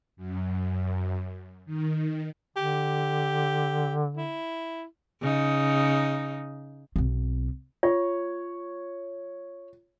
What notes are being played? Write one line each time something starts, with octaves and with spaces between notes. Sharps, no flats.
F#2
D#3
D3 G4
E4
C#3 D#4
B1 C4
F4 C#5